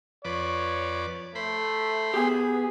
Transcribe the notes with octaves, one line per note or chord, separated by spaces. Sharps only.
F2 B4 C#5 D5
A3 C5 B5
B3 G4 G#4 G#5